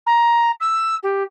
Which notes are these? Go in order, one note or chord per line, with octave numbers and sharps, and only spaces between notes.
A#5
E6
G4